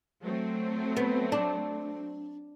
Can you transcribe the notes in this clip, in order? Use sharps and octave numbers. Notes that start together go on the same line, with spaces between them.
F#3 A3 C4
B3
D4